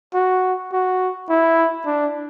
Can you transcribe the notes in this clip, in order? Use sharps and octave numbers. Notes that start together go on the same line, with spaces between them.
F#4
F#4
E4
D4